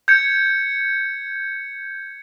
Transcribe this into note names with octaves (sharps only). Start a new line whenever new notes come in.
G6 G#6 C#7